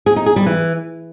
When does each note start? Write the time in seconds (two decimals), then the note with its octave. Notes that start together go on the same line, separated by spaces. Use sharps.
0.06 G#4
0.16 D#4
0.26 G#4
0.36 G3
0.46 E3